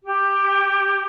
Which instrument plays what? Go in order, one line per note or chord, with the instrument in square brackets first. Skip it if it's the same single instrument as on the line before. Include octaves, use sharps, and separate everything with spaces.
[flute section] G4